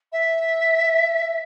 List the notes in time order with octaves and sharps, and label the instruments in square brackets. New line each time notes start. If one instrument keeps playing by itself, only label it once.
[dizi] E5